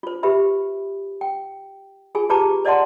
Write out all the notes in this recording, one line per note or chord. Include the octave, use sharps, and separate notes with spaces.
F4 C5
G4 B4 E5 B5
G5
F4 G#4 G#5
F4 G4 B4 A5 A#5 D6
C5 D5 D#5 F#5 A5 C6